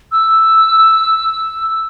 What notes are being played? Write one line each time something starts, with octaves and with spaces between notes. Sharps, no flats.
E6